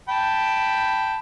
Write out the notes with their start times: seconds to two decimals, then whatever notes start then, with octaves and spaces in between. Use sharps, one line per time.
0.09 G5 A5 B5